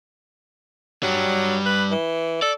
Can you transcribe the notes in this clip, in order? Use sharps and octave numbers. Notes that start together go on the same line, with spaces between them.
G2 F#3 G3
B4
E3
A4 D5